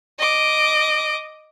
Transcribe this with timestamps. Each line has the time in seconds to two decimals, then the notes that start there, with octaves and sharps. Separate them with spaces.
0.18 D#5 D6